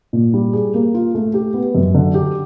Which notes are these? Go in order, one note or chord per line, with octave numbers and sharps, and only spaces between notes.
A#2
G3
G#4
A#3
F4
A3
G4
B3
F#2
D3
G4